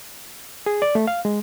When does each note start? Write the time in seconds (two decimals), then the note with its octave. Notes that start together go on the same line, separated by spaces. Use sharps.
0.66 G#4
0.82 D5
0.95 A3
1.07 F5
1.25 G#3